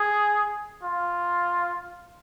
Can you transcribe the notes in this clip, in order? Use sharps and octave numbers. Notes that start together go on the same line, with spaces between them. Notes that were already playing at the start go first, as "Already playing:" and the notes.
Already playing: G#4
F4